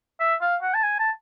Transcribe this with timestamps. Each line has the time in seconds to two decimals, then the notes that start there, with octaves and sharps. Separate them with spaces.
0.20 E5
0.41 F5
0.62 F#5
0.74 A5
0.83 G#5
0.99 A5